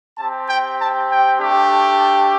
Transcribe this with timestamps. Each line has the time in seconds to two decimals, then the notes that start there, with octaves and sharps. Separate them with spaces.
0.18 C4 G4 A5
0.49 G5
0.77 A5
1.09 G5
1.38 A3 D4 G4
1.98 A5